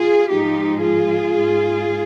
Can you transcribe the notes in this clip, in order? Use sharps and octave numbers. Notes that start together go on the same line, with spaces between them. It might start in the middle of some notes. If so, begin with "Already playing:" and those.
Already playing: F4 G#4
G#2 F3 G#3 D#4 G4
F4 G#4
G#2